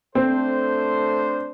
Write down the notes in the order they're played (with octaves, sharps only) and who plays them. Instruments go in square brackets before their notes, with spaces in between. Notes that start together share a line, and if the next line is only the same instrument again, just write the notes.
[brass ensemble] A3 D4 A4 C5 [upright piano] C4